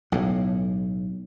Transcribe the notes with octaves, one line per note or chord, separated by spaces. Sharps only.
B1 A2